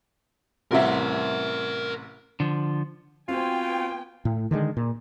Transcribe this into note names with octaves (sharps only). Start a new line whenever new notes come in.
A1 C3 A#4 E5 F#5
D3 F3
B3 C4 F4 F#4 C5 G5 G#5
A2
D3 D#3 G3 G#3
A#2